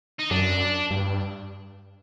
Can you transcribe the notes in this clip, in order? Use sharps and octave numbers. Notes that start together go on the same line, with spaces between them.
D#4
F#2 D4
G2